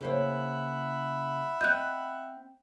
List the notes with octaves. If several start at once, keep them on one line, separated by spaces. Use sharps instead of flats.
C#3 A#3 E4 C5 C#5 E5 F#5 B5
C4 D#5 F#6 G6